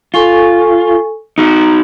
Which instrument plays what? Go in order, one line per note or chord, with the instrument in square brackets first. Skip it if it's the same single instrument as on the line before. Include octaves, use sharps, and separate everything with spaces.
[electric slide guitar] F4 [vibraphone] A4 G#5 C#6
[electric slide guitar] D#4 F#4 [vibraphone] A#5